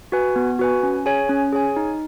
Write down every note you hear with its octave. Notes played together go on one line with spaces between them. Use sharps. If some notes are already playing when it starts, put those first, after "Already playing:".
F#4 B4 G#5
B3
F#4 B4 G#5
C#4
G#4 C#5 G#5
C#4
G#4 C#5 G#5
D#4